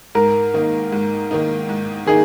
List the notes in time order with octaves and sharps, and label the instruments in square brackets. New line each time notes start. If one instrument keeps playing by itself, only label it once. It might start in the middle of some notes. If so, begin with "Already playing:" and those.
[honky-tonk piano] G#2 [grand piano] A#4
[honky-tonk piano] D#3 A#3 D#4
G#2
D#3 A#3 D#4
G#2
[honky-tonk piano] D#3 A#3 D#4 [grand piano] G#4